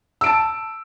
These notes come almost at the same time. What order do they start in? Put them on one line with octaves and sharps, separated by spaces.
E6 D7 A5